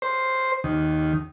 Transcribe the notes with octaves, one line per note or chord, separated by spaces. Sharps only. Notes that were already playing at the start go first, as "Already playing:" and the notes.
C5
D#2